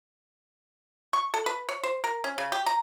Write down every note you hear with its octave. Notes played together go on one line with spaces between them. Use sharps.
C#6
A4
B4
C#5
C5
A#4
C#4
C#3
G4
A#5